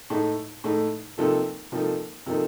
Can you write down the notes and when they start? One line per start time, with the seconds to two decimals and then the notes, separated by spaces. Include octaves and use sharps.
0.10 A2 A3 D#4
0.64 A2 A3 D#4
1.18 C3 F3 A#3 D#4 A4
1.72 C3 F3 A#3 D#4 A4
2.26 C3 F3 A#3 D#4 A4